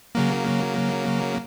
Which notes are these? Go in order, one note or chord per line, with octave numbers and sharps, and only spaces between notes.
C#3 F#3 A#3